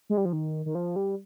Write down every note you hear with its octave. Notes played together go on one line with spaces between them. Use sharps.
G#3
G3
F3
D#3
D#3
F3
G3